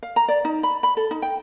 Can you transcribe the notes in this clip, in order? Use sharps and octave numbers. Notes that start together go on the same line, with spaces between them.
F5
A#5
D5
D#4
B5
B5
A4
D#4
G5